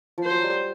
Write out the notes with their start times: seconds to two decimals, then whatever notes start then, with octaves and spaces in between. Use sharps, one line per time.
0.18 F3
0.24 C5
0.31 F#3
0.44 G3